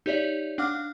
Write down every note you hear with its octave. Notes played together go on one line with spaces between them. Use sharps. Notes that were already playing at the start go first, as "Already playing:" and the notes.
D#4 G4 C#5 D5 E5
D4 F5 F#5 D6 F6